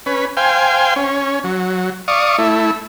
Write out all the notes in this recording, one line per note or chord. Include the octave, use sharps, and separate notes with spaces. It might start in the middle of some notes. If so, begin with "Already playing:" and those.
C#4 B4
C5 F5 G5 G#5
C#4
F#3
D5 F5 C#6 D#6
A3 E4